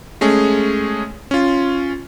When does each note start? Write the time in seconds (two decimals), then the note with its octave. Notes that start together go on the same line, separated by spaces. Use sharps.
0.21 G#3 A3 C#4 G#4
1.31 C#4 F4